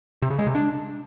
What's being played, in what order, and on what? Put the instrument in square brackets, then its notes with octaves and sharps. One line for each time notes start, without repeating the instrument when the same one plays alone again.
[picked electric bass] C3
C#3
G#3
C3
D4